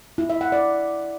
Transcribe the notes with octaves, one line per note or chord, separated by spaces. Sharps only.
E4
E5
F#5
D5